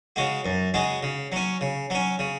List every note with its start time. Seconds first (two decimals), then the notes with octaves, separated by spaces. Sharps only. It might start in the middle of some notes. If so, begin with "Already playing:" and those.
0.16 C#3 G#3 F#4
0.45 F#2
0.74 C#3 G#3 F#4
1.03 C#3
1.32 F#3 C#4
1.61 C#3
1.90 F#3 C#4
2.19 C#3